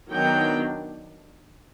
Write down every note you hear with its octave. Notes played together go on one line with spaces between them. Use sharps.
D#3 F#3 B3 D4 G5